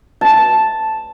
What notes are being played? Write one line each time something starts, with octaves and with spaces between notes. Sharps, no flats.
A5